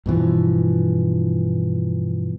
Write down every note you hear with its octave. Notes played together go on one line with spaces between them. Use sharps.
G2 B2 E3 F3